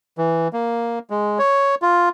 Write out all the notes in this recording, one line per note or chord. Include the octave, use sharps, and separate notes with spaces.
E3
A#3
G#3
C#5
F4